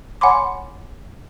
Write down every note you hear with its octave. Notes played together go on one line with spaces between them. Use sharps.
C#5 F#5 G#5 B5 C6 D6